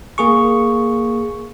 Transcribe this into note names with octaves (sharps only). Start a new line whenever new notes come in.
A#3 G#4 C#6